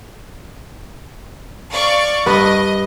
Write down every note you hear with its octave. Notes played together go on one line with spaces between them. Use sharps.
D5 F5 C#6
G2 B4 D#5